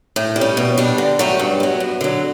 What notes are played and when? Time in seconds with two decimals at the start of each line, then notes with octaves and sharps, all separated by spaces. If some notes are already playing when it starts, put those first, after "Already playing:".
0.16 A2
0.36 G3
0.41 C#4
0.57 B2
0.78 G3 D4
0.98 D3
1.19 F#3 A3 C#4 G4
1.39 G2
1.60 F#3 B3
1.80 F#2
2.01 D3 F#3